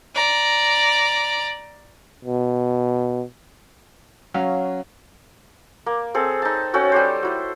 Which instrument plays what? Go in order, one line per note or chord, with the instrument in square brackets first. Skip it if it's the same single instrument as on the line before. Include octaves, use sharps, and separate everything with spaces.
[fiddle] D5 A#5
[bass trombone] B2
[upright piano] F#3 [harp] C#4 F5 F6
[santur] A#3
C4 G#4 A4
D#4 A5
C#4 F#4 A4 G5
G3 G4 C5
E4 F#4